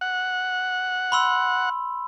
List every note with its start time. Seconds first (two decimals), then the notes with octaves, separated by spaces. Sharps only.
0.01 F#5
1.12 B5 C6 E6